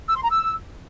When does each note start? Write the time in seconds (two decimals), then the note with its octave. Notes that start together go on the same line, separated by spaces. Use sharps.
0.09 E6
0.16 C6
0.23 A#5
0.31 E6